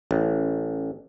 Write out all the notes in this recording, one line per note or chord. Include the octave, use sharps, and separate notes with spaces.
A1